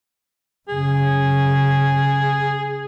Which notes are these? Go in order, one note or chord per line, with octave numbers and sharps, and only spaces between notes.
F#2 C#3 G#4